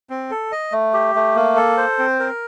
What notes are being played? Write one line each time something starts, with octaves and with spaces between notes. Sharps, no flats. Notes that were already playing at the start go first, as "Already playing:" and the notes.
C4
A4
D#5
A3
G4
A3
A#3
A4
C5
C4
A#4